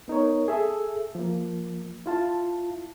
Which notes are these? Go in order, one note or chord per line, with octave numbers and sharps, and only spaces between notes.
B3 D#4 A#4 C#5
G#4 A4 E5
F3 A#3
E4 F4 A5